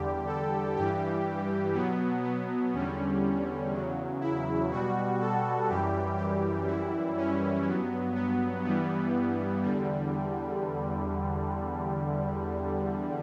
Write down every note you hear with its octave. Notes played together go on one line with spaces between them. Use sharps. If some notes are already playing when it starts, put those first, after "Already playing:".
Already playing: E2 D3 G3 G4
A4
G2 E3 G3 G4
B2 F#3 B3
B3
E2 D3 G3 C#4
E2 C#3 F#3
E4
B2 G3 F#4
A4
F#2 E3 G3 G4
G4
F#2 E3 G3 E4
C#4
G2 F#3 B3
B3
G2 E3 G3 B3
E2 D3 G3